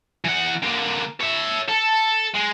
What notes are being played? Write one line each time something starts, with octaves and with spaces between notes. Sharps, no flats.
E3 F#5
D3 A#3
C#5 E5
A4
G#3